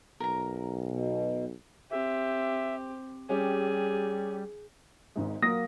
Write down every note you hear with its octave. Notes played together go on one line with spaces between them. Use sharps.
B1 A#4 A#5
B2
C4 G4 E5
G3 C#4 G4 G#4
G#1 G#2 G#3
F#3 A#3 A#4 D#6 A#6